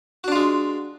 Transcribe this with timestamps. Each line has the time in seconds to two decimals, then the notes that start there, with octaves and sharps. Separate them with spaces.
0.24 F#4
0.28 D4
0.32 F4
0.36 G#3